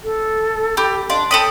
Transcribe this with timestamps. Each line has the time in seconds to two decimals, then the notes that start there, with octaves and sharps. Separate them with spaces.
0.04 A4
0.77 G4 G5 B5 D6
1.10 D4 D#5 F5 C6
1.31 A4 C#5 G5 B5 D#6 D7